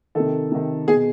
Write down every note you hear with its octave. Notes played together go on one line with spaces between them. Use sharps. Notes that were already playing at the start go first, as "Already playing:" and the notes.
C3 D#3 A4
C3 D#3
B2 G#4